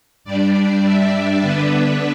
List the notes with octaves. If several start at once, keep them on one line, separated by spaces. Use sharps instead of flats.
G2 G3 D4 D5
E5
D3 B3 D4 B4